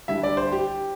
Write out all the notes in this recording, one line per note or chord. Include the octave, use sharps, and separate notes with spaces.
D3 G3 E4 E5
D5
C5
G4